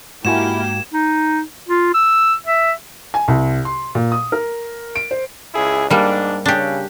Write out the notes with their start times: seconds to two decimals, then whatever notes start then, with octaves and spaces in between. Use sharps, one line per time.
0.25 G#2 A#3 E4 F#4 G4 G#5 G#6 E7
0.94 D#4
1.69 F4
1.94 E6
2.47 E5
3.14 G#5
3.28 C2
3.65 C6
3.95 A#2
4.12 D#6
4.32 A#4
4.96 D7
5.11 C5
5.55 C#2 E4 G#4
5.90 G#2 G3 A#3 D4
6.46 C#3 D4 G4